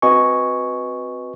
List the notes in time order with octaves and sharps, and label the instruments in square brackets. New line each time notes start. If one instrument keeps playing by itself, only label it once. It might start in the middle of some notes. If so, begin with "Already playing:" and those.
[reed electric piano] C4 F#4 B4 D#5 G#5 C#6